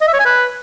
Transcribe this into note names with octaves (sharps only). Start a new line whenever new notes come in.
D#5
E5
C#5
G#5
B4